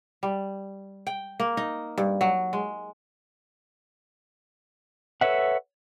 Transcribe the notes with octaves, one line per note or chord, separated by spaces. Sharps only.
G3
G5
A#3
D#4
G2
F#3
G#3
A4 B4 C#5 E5 F#5